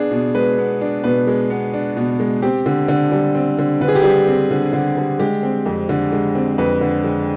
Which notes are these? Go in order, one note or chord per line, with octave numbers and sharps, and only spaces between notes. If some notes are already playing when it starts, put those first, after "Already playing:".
Already playing: B3 D4 G#4
B2
G#3 B4
B3
D4
B2 B4
G#3
B3
D4
B2
G#3
C4 G4
D3
D3
G3
C4
D3
D3 B4
G#4
G4
G3 G#4
C4
D3
D3
G3
G#3 G4
C4
F2
D3
G#3
C4
F2 B4
D3
G#3